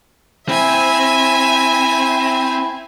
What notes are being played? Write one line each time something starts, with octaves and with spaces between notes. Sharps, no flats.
C4 E4 E5 G#5